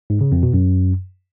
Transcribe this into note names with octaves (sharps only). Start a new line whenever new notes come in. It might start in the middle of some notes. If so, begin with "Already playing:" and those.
G#2
C#3
F2
B2
F#2